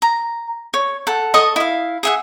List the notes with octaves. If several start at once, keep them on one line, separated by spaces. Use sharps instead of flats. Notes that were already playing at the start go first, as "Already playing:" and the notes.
A#5
C#5
A4 F#5
A4 D#5 C#6 D#6
E4 F5
G#4 E5 F#5